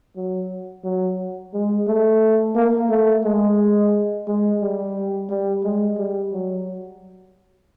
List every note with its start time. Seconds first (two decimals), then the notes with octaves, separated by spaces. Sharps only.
0.16 F#3
0.84 F#3
1.54 G#3
1.88 A3
2.55 A#3
2.90 A3
3.24 G#3
4.27 G#3
4.61 G3
5.30 G3
5.63 G#3
5.98 G3
6.32 F#3